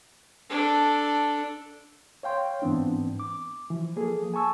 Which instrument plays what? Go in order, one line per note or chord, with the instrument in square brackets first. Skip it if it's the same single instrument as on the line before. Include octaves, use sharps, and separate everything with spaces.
[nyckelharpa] D4 A4
[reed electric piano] C#5 F5 G5 C6
G#2 E3 B3 C4 D4
D6
E3 F3
F3 A#3 G#4 A4
G#5 A5 C#6 E6